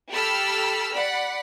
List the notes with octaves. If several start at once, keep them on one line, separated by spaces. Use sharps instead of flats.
G4 A4 A5 B5 E6 F6
D5 F#5 B5